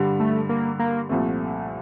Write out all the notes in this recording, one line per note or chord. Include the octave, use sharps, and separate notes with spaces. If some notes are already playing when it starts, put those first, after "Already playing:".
Already playing: G2 D3 G3
A3
A#3
A#3
C2 A#2 F3 A3 C4